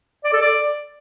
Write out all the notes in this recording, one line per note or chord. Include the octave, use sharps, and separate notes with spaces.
D5
A4
D5